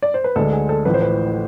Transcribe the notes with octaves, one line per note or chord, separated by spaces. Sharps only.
D5
C5
B4
D2 D3 G#3 D4 A4
G#4
A4
A1 A2 F3 B4
C5
B4